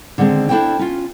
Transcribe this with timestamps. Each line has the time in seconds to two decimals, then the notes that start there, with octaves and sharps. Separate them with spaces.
0.18 D3 D#3 G#3 C4
0.49 D4 E4 F#4 A4 C5 G5
0.79 C#4 F4